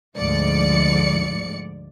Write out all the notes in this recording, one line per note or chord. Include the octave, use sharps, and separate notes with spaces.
D2 G#2 F3 D5 C#7